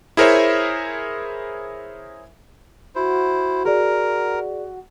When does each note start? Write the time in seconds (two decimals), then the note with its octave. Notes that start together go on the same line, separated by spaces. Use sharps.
0.17 E4 G#4 A#4 C5 C#5 E5
2.95 E4 F#4 C5
3.65 G#4 A#4 D5